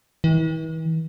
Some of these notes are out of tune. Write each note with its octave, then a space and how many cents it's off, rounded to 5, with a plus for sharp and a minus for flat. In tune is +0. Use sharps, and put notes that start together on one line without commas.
E3 -40